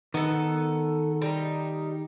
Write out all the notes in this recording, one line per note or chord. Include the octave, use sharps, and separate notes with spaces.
D#3 B3 A4
G3 D#4